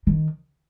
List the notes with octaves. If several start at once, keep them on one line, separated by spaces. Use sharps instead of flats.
D#3